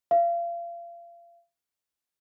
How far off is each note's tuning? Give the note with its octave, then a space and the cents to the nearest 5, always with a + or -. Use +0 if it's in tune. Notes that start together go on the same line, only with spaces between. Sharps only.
F5 -35